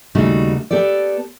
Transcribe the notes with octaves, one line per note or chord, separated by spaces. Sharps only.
D#2 C#3 G3 A3 D#4 F#4
B3 G4 A4 D5